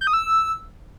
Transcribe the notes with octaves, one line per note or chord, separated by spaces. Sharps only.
G6
D#6
E6